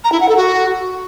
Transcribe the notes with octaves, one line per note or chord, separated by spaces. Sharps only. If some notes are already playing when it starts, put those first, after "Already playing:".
A#5
E4
F#5
A4
F#4